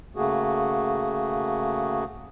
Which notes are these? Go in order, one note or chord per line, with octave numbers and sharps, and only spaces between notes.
C#3 A3 A#3 F#4 G#4